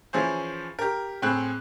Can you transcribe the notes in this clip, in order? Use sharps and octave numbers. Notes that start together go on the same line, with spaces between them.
E3 F3 C#4 G#4 C5
G4 A#4
A2 C4 G#4 F#6